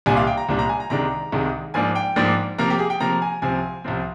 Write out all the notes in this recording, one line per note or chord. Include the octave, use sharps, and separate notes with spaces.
C2 A#2 G3 D4 G#5
F5
G5
A#5
C2 A#2 G3 D4
A#5
G#5
A#5
C2 C3 D#3 G#3 D4 A#5
C2 C3 D#3 G#3 D4
G#2 F3 A#3 D4 G#5
G5
G#2 F3 A#3 D4
C3 F3 A#3 A#5
G4
G#4
G5
C3 F3 A#3 A#5
G#5
C2 C3 F3 C4 G#5
C2 C3 F3 C4